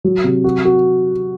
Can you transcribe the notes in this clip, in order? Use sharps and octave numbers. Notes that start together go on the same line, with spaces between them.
F#3
C3
F#4
F#4